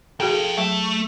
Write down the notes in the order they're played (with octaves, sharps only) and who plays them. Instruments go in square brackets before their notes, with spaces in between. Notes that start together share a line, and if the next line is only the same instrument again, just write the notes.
[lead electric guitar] F3 G5 [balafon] F#4 G#4 A4
[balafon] F#3 [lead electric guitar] A3